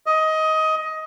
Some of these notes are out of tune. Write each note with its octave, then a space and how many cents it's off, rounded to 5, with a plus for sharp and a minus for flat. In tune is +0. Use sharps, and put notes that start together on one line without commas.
D#5 +15